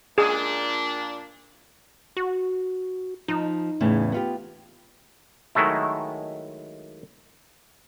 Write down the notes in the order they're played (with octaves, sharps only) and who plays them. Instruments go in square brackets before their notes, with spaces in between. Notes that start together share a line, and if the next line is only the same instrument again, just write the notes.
[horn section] A#2 D4 [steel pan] G#4
[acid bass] F#4
[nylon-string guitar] F3 [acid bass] D#4
[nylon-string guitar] E2 A2 C#3
B3 F4 G4
[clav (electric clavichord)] D#3 F#3 G#3 A3 E4